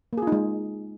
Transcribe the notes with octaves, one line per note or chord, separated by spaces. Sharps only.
G#3 A#3 D#4 F4 G#4